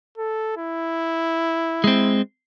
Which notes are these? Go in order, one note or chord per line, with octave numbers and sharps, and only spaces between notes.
A4
E4
G#3 C4